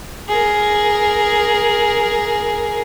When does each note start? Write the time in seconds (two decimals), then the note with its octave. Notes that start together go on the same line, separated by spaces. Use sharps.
0.29 G#4 A#4